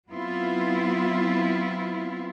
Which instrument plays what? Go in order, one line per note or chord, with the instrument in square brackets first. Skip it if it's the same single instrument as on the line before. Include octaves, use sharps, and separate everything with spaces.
[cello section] F#3 B3 C4 E4 F4